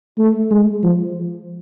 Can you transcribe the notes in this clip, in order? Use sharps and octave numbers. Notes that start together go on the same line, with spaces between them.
A3
G#3
F3